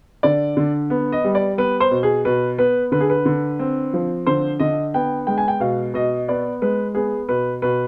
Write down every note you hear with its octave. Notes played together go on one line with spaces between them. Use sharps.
D3 D5
D3
B3
D#5
G3
D5
B3 B4
C5
B2
G#4
B2 B4
B3 B4
D3 B4
G#4
B4
D3
C4
F3
D3 C5
D3 D#5
B3 G5
G#3 G5
G#5
G5
B2 F5
B2 D#5
B3 D5
G#3 B4
B3 G#4
B2 B4
B2 B4